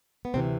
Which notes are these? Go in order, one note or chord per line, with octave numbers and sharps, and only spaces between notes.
B3
D2 C3 E3 C4